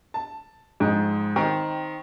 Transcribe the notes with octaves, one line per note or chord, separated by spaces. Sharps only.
A5
F2 G#2
D#3 C4